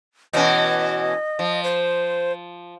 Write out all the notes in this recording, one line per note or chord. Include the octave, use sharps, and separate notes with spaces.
B2 E3 C#4 D#5
F3
C5